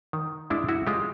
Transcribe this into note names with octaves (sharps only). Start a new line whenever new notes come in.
D#3
G#3 D4 E4
E4 F#4
G#3 F4 G4